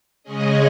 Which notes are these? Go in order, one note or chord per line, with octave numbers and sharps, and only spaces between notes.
C#3 G#3 C#4 G#4 D#5